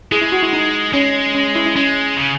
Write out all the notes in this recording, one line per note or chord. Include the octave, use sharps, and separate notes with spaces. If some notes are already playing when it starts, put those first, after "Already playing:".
G#3 E4 G#4
E4
F#4
E4
D#4
G#3 C#4
C#4
E4
E4
G#3 C#4
C#3